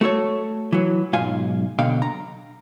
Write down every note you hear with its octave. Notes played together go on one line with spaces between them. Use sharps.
A3 F#4 A4 C#5
E3 F#3
B1 G#2 F4 F5 G#5
B1 B2 D3 F5 G5
A#5